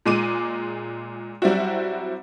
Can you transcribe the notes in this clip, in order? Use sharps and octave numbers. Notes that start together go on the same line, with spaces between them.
A#2 G#3 D6 D#7
F#3 G3 C4 E4 F#4